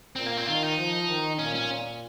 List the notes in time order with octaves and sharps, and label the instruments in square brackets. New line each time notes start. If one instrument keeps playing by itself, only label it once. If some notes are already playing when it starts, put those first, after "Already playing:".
[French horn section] A#2 [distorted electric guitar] C4
[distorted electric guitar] A#3
C4
[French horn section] D#3 [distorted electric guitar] F4
[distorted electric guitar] D#4
[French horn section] F3
D#3
[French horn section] A#2 [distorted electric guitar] C#4
[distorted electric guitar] C#4